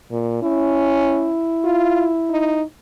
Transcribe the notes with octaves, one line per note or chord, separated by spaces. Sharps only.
A#2
C#4 E4
F4
D#4